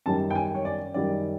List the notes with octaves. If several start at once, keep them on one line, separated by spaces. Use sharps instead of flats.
F#2 D#3 G3 A5
G5
G#5
C#5
D5
F#2 D#3 G3 D5